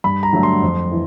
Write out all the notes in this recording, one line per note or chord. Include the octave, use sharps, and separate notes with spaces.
G2 B5
A#5
D3 F#3 A3
C6
F2
E3